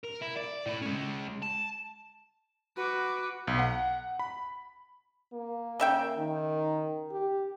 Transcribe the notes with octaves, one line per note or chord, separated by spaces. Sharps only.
A#4
E4
D5
A2 E4
G#3 C#4
A5
F#4 B4 D6
B1
F#5
B5
A#3
C#3 E5 G5
D#3
G4